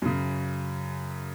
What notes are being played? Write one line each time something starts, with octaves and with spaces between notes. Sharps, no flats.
F#2 C#3